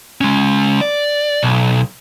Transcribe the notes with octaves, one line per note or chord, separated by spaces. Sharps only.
G#3 C#4
D5
B1